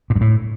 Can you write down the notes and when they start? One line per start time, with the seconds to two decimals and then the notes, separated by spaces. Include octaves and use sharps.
0.10 A#2
0.16 G2
0.21 A2